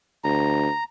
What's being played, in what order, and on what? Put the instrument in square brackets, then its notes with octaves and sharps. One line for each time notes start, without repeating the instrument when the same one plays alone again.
[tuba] D2 [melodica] A#5